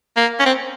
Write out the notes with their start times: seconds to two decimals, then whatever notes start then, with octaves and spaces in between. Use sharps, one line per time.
0.16 A#3
0.40 C#4
0.45 C4